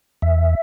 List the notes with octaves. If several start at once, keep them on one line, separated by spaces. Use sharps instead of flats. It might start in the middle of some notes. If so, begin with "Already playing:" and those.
E2 E5